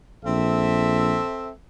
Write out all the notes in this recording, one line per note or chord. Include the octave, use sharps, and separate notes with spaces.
A#1 C4 A4 E5